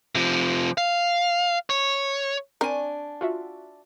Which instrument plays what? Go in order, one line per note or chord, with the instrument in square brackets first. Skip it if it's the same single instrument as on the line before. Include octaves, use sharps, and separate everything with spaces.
[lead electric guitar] C3 F3
F5
C#5
[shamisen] C4 A#4 [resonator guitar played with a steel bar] D4 G#5 [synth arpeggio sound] C#6
[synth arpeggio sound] F4 F#4 E5